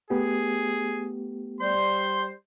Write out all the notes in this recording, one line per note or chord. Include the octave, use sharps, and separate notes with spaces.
A3 B3 G4 G#4
G3 C5 C6